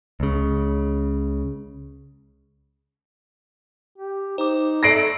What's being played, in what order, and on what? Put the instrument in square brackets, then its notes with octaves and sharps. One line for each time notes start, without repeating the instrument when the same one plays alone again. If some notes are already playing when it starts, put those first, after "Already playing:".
[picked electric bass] C#2 C#3
[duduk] G4
[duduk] D#4 [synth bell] C5 D6
[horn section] A3 [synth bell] D5 A#5 B5 [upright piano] A#6 C7 D7